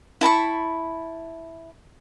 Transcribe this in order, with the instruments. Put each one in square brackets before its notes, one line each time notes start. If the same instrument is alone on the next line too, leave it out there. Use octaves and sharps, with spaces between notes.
[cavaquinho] E4 A5 B5 C#6